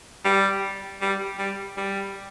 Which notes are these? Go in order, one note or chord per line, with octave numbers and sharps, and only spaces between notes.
G3
G3
G3
G3